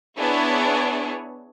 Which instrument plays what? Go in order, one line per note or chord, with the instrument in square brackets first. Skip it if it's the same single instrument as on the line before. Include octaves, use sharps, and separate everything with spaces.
[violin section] B3 D4 E4 G#4 C#5